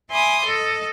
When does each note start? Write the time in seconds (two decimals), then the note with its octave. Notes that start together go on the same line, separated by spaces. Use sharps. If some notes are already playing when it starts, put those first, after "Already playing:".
0.10 E5 G#5 B5 C6 D6 D#6
0.45 A4 D#5